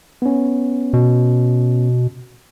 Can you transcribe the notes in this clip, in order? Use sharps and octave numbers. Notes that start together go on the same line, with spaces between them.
B3 C#4
B2